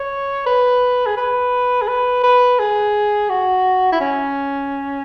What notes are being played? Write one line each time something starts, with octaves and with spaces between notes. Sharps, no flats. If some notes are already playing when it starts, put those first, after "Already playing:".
Already playing: C#5
B4
G#4
B4
G#4
B4
B4
G#4
F#4
E4
C#4